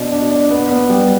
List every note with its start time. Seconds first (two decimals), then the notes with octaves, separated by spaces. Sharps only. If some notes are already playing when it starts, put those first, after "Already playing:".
Already playing: B2 D4
0.12 D4
0.31 D4
0.50 B3
0.71 B3
0.90 G3